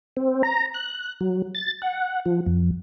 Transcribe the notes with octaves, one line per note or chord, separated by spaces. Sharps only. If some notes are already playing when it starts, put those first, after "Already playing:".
C4
A#5
F#6
F#3
A6
F#5
F3
F2